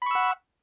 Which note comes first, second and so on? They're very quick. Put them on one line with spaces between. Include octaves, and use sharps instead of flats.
B5 C#6 E6 F#5